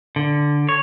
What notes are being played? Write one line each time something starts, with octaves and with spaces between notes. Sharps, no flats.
D3
C#5